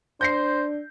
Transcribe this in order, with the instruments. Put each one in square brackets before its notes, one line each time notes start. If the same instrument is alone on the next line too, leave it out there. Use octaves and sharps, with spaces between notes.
[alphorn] D4 [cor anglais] C5 [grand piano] G6 A#6 C7